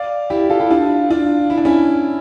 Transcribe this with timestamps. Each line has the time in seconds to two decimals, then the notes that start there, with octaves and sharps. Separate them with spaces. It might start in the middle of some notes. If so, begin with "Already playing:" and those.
Already playing: D5 F5
0.30 E4 G4
0.50 F4 A4
0.60 E4 G4
0.70 D4 F4
1.10 D4 F4
1.50 E4
1.57 D4
1.65 C#4 E4